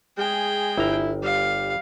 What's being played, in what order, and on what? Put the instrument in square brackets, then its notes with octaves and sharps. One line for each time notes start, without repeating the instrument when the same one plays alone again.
[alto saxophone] G#3 [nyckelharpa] G#4 G5
[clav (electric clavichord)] G1 A#5 [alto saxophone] E4
[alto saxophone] G3 [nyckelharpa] F5